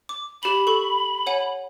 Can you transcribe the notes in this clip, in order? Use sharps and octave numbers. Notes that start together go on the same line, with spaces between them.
D6
G4 B5 F#7
A4 C#6
C#5 F#5 G#5